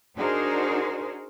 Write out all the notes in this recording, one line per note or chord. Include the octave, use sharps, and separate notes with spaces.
D4 D#4 F#4 G#4 A#4 C5